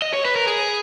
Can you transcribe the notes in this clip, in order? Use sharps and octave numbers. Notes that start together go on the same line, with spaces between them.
D#5
C#5
B4
A#4
G#4